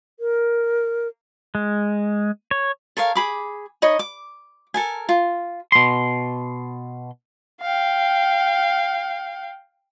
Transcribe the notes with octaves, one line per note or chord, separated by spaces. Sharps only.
A#4
G#3
C#5
A4 A#4 C#5 F5
G#4 B5 D6
D#4 C#5 D#5 B5
D6
A4 A#4 G#5
F4
B2 C6
F5 G5